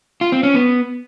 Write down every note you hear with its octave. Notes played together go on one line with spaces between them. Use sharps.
F4
C4
C#4
B3